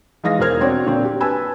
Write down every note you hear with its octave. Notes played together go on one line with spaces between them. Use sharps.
E3 G#3 D#4 F5 D#6 A#6
E1 G#4 A#4 C5 F6 G#6
C4 D4 F#4 C#5 D5
A#2 D3 A#3 C4
G4
B4 G#5 A5 B5 E6